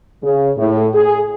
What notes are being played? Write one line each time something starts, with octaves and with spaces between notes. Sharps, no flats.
C#3
A2
G#4